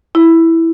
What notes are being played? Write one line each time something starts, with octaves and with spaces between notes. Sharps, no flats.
E4